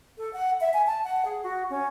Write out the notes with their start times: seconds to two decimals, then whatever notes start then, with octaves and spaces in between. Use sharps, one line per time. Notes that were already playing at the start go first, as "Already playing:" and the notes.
0.18 A4
0.33 F#5
0.61 E5
0.74 G#5
0.86 A5
1.04 F#5
1.25 G#4
1.43 F#4
1.70 C#4